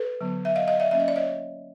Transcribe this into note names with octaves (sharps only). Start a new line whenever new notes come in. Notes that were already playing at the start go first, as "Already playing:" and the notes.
Already playing: A4 B4
D3 F#3 B3
E5
D#5 F5
D#5 F5
D5 E5
F#3 A#3 C#4 E5
D#5
D5
C#5 D#5